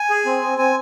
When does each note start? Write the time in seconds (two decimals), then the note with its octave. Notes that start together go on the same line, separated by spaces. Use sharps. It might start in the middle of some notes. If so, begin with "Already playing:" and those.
Already playing: G#5
0.10 G#4
0.26 C4
0.42 C4
0.58 C4 G#5